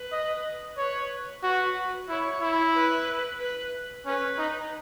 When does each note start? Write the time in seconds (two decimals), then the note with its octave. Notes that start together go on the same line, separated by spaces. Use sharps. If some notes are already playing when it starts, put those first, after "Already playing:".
Already playing: B4
0.12 D#5
0.78 B4 C#5
1.43 F#4 B4
2.09 E4 C#5
2.42 E4
2.74 B4
3.40 B4
4.06 C#4 B4
4.38 D#4